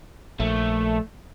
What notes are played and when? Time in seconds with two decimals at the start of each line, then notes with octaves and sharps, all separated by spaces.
0.40 A#1 A3